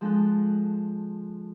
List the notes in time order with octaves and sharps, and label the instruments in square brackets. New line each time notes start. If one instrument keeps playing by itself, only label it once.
[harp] F3 G#3 D4 A4 F#6